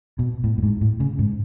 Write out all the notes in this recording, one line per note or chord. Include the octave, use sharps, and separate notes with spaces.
B2
A2
A2
G#2
A2
C#3
G#2